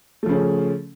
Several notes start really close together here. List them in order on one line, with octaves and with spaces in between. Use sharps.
A3 F3 C#3 C#4